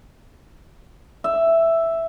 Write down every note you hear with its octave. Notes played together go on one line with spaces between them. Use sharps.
E5